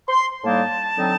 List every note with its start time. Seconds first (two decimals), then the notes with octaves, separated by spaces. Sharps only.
0.08 C6
0.44 A2 G3 A#3 D#4 A5
0.97 D3 F#3 C4 D#4